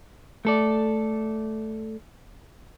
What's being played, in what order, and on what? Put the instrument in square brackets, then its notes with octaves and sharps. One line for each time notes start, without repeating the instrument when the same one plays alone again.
[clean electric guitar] A3 A4 D5